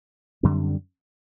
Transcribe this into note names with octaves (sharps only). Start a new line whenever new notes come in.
F#2 D3 G3 C4